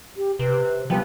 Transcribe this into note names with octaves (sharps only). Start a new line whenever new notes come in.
G4
C3 B4
F3 G3 B3 B4 G5